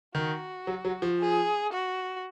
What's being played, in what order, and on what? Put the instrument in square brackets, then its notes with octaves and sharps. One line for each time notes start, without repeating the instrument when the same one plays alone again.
[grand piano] D#3 [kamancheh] F#4
[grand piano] F#3
F#3
F3
[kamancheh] G#4
F#4